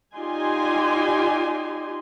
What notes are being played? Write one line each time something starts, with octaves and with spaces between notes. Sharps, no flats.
D#4 F4 G4 D5 G#5 C6